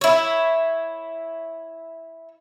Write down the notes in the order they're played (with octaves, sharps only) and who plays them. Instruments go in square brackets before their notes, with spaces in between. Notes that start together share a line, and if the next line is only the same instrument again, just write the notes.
[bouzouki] E4 C#5